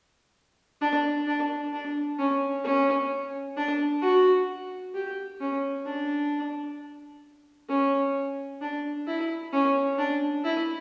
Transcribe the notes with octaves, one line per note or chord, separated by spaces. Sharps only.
D4
D4
D4
C#4
C#4
D4
F#4
G4
C#4
D4
C#4
D4
E4
C#4
D4
E4